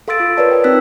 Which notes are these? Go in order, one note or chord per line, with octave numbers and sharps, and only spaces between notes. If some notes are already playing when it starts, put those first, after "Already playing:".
A4 F5 C6 E6 A6 D7
F4
A#4 B4 C#5 D5 A5
G5
C4 D#4 E6 F#6 B6